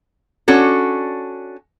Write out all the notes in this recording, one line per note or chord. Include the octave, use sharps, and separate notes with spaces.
C#4 D4 F#4 A4